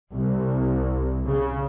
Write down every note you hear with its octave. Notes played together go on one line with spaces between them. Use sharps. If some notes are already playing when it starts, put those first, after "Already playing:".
C2
C#3